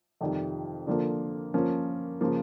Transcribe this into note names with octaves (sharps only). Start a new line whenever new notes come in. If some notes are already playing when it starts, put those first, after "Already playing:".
F2 C3 D#3 G3
D3 F3 A#3
F3 A#3 C#4
C#3 F3 A#3